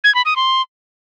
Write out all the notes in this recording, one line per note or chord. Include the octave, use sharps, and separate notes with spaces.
G#6
B5
D#6
C6